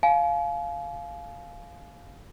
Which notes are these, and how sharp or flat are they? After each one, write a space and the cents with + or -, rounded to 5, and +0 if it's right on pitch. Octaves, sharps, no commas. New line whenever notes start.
F5 +0 G#5 +40